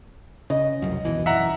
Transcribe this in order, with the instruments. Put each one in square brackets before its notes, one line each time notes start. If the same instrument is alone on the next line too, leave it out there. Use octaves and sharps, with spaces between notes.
[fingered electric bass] C#3 [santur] D#5
[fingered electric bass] F1 C2 F#2
D#2 B2 E3
[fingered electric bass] F#2 E3 [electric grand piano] E5 F#5 A#5